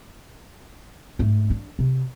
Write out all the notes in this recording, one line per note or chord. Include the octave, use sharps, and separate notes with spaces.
G#2 A3
D4
C3